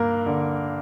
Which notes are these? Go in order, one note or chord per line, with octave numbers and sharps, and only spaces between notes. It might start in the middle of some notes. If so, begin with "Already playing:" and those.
Already playing: G2 A#3 A#4
D3